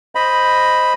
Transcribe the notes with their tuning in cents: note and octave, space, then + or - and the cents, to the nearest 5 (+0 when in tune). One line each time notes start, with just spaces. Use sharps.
C5 +0 D#5 +0 B5 +0